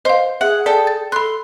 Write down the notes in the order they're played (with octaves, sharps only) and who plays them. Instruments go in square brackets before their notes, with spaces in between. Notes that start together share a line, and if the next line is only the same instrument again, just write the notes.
[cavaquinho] C5 [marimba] D#5 F5
[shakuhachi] G#4 [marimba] E5 [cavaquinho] F#5
[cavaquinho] A4 G5 A5 [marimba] D5
[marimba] A6
[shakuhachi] A4 [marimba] B5 F#6 [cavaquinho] C6